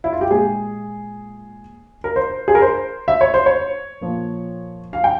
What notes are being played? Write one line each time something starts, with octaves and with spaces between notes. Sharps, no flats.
E4
F4
G4
A#2 G#3 G#4
A#4
C5
G#4
A#4
C5
E5
C#5
C5
C#5
A#2 F3 A#3
F5
G5